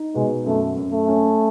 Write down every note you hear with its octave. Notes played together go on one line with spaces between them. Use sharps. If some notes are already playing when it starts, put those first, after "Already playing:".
Already playing: D#4
B2 G#3
F#2 A3
F#2
A3
C#4